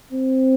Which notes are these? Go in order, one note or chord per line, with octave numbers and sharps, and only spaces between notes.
C4